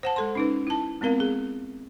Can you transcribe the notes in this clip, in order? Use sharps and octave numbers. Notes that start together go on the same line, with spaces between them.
C5 F#5 A5
G#3 A4 C6
C#4 D#4 B4
E4 A5
G#3 B3 C4 A#4 F5
G#4